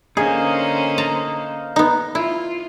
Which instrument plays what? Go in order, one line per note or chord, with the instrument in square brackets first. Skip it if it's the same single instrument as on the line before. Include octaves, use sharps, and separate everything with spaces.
[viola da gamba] D3 C#4 C5 [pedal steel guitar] A#3 D#4 [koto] G#4
[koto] A5 A#5
B3 D#4
[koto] E4 [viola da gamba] F4